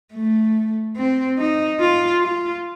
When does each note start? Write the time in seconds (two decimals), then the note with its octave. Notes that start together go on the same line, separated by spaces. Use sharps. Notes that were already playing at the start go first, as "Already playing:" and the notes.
0.14 A3
0.97 C4
1.38 D#4
1.80 F4
2.21 F4